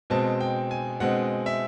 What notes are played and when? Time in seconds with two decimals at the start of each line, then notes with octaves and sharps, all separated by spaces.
0.10 B2 G#3 C4 A5
0.40 G5
0.71 G#5
1.00 B2 G#3 C4 F#5
1.46 E5